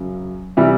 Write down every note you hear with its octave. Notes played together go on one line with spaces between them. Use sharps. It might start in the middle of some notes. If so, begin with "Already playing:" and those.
Already playing: F#2 C#3 F#3
C3 E3 G3